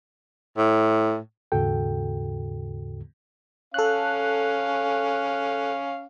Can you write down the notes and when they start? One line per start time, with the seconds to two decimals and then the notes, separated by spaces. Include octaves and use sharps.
0.57 A2
1.52 D#2 G#2 C#3 F#4 A4 G5
3.74 C#4 A4 F5 F#6